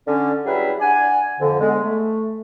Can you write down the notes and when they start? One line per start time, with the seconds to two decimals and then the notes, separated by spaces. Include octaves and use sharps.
0.07 D3 C#4
0.45 F#3 G3 E4 G#4 B4 E5
0.80 D4 D5 F#5 G#5
1.40 F2 D3
1.60 D3 G#3 B3
1.83 A3